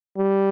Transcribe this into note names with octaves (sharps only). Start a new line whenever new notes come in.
G3